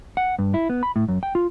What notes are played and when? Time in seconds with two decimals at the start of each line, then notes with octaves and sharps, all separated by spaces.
0.17 F#5
0.39 G2
0.54 E4
0.69 B3
0.83 B5
0.96 A2
1.08 F#2
1.23 G5
1.35 F4